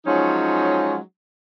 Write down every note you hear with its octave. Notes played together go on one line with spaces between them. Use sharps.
F3 F#3 G#3 C#4 D#4